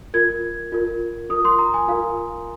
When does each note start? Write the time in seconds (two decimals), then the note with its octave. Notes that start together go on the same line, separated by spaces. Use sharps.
0.14 F4 A#4 G#6
0.72 F4 A#4
1.30 F4 A#4 D#6
1.45 C6
1.59 A#5
1.74 G#5
1.88 F4 A#4 F5